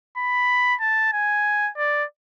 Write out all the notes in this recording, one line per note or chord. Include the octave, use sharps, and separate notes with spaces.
B5
A5
G#5
D5